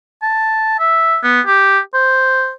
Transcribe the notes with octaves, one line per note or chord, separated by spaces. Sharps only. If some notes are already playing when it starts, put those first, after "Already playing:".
A5
E5
B3
G4
C5